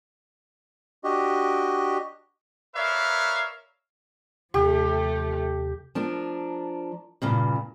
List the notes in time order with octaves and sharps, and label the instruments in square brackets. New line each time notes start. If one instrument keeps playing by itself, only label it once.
[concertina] D4 F#4 G4 D#5
[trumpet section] A#4 B4 C#5 D5 E5 F5
[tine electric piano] D#2 C3 [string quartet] F3 A3 [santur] G4
[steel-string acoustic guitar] F3 D4 A#4
G2 A#2 C#3